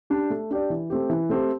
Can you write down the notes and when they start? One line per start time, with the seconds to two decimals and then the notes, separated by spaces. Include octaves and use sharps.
0.10 D4 G4 D5
0.30 A3
0.51 D4 G4 D5
0.70 E3
0.90 A3 C4 G4
1.10 E3
1.30 A3 C4 G4